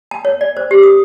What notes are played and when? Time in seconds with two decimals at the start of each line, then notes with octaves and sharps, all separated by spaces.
0.11 A5
0.25 C#5
0.41 D5
0.57 C5
0.71 G4
0.83 D#6